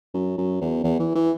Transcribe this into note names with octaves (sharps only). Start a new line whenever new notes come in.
F#2
F#2
E2
E2
E3
E3